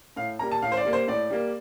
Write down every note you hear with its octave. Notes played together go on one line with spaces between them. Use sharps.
A2 F5
G3 A#3 A#5
A5
A2 F5
C5
D5
G3 A#3
C5
A2 D5
G3 A#3